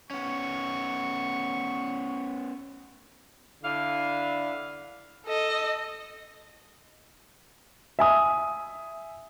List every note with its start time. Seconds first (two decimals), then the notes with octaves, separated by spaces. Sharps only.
0.11 B3 C#4 C#6
3.64 D3 D4 E4 F5
5.26 A4 D#5
7.99 E5 G#5 D#6